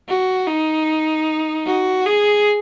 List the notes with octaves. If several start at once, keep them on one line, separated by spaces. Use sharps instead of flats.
F#4
D#4
F#4
G#4